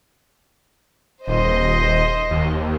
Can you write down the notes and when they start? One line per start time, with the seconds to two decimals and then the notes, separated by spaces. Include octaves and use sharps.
1.27 D#1 C5 D#5
2.30 D#2